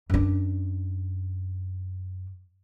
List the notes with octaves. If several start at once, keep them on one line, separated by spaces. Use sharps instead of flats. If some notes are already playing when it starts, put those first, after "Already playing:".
F#2 D4